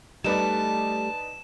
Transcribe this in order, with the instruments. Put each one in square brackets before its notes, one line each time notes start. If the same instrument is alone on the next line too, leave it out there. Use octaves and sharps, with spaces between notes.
[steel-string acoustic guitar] G3 A3 [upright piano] D#4 B4 D5 [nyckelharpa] A5 [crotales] E7